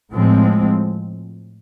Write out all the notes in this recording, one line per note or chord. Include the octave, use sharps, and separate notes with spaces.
A2 F3 G#3 C4